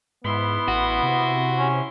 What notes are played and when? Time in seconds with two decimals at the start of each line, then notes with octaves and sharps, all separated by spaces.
0.24 G#2 B3 E4 C6
0.68 A1 F#4
1.03 C3
1.58 C#4